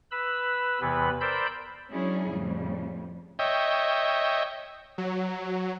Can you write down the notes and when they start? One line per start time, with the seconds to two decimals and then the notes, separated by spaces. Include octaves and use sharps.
0.11 B4 B5 E6
0.81 E2 C3 E3 B3 B4 B5
1.20 A#4 C5 D5 B5 E6 G6
1.90 F#3 G#3 C#4 D4 E4 G#4
2.29 F2 A2 C#3 G3
3.39 C#5 D#5 E5 G5
4.98 F#3